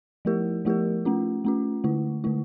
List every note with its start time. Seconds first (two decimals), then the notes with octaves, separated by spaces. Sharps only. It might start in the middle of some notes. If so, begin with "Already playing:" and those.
0.25 F3 A3 E4 G4 A#4
0.65 F3 A3 E4 G4 A#4
1.05 A3 C#4 F4
1.45 A3 C#4 F4
1.84 D3 A3 E4
2.24 D3 A3 E4